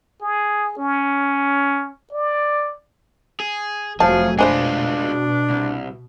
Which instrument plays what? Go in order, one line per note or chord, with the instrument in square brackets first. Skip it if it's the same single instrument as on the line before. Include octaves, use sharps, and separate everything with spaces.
[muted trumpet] G#4
C#4
D5
[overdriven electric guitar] G#4
[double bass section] F1 F#3 A3 [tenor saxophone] F3 [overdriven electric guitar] G#4 [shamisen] A5
[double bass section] B2 [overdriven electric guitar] G#3 F4 [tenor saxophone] D4 [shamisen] B4 C5 G#5
[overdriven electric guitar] C2